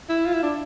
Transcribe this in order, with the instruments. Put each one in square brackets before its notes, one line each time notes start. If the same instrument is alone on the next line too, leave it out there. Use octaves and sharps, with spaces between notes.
[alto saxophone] E4
F4
E4
D4